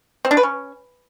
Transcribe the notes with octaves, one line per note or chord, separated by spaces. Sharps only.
C4
D4
B4
C#4